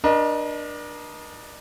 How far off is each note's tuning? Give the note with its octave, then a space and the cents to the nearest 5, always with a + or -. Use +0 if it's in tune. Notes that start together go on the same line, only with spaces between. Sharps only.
D4 +15 A#4 +45 D#5 +0